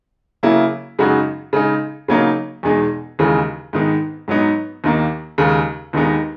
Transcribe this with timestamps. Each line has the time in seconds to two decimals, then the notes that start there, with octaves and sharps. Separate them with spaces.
0.43 C#3 F#3 A#3 E4
0.99 F#2 C#3 G#3 D#4 F#4
1.53 C#3 G#3 D#4
2.08 C#3 F#3 A#3 D#4
2.63 E2 B2 G#3 D#4 G#4
3.19 D#2 C#3 E3 G#3
3.73 G#2 D#3 G#3 B3 D#4
4.28 G#2 F#3 B3 D#4
4.84 D#2 D#3 A#3
5.38 D#2 C#3 G#3
5.93 D#2 D#3 G#3 B3 D#4